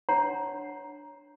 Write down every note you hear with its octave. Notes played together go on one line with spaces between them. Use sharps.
D4 C#5 F#5 A5 A#5 C6